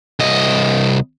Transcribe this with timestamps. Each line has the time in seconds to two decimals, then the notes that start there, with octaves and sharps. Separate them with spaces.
0.20 C2 D#5